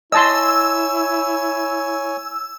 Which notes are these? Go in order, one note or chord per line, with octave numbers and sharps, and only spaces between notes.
E4 C#5 D#5 G#5 A5 C6 E6